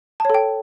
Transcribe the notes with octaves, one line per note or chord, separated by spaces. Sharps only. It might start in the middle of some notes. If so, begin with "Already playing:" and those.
A4 C#5 G5 A5